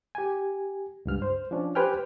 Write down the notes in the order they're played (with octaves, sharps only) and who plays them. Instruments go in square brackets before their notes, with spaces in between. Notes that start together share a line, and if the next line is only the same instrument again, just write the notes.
[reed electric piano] G4 G#5
C#2 G2 F6
C5
F3 C#4 D4
G4 B4 C5 G5 G#5 F6